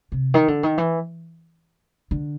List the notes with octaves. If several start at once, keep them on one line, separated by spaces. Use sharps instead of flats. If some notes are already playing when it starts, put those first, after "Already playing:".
C3
D#3
D3
D#3
E3
D3